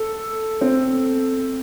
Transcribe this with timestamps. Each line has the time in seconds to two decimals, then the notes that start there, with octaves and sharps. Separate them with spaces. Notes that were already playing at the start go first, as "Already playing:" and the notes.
Already playing: A4
0.61 C4